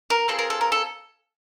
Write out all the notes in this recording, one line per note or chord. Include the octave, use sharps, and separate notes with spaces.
A#4
C4 F4 G#4 A4
A#4
A4
A#4
A4